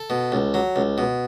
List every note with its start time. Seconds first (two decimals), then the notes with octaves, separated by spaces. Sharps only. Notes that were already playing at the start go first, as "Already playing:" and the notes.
Already playing: A4
0.10 B2
0.32 C#2
0.54 F#3
0.76 C#2
0.98 B2